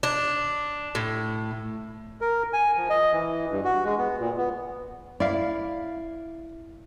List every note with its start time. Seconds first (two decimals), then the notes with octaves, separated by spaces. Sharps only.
0.03 D4
0.95 A2
2.21 A#4
2.53 G#5
2.77 F3
2.90 D#5
3.12 E3
3.51 G2
3.64 F#4
3.85 G#3
3.98 B3
4.20 A#2
4.37 B3
5.20 E4 D5 F5